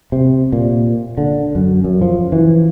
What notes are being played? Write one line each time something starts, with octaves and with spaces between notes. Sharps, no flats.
C3
A#2
D3
F#2
F#2
F3
E3